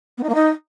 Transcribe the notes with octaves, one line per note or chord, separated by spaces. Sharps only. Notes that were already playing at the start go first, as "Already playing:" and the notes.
B3
D#4
A#3
D#4